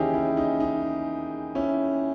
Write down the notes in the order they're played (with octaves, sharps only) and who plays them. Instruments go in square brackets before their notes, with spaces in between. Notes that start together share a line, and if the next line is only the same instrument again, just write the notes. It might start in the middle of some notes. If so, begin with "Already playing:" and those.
Already playing: [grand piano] D#2 C#3 E3 C#4 D#4 E4 G4 G#4
C#4 E4
D#4
D#4
C#4 E4